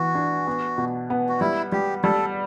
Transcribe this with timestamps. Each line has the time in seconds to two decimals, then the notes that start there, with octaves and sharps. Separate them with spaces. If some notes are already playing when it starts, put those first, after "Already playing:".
Already playing: E3 B3 F#4
0.15 D4
0.47 B3
0.78 B2
1.10 B3
1.29 F#4
1.40 G3 E4
1.72 G3 G4
2.04 G3 A4